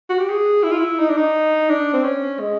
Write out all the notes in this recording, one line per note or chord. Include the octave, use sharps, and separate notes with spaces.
F#4
G4
G#4
E4
F4
E4
D#4
D4
D#4
D4
C4
C#4
G#3